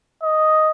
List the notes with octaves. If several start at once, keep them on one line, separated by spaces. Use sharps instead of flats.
D#5